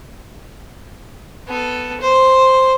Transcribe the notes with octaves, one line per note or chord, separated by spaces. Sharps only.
B3 A4
C5